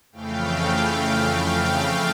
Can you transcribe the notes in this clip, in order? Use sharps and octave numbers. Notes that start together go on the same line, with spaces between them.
F2 C#3 E3 A3 F5 G5
F5 G5